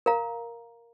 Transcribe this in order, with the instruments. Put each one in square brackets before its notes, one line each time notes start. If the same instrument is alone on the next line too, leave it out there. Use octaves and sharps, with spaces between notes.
[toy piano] A#4 F5 A#5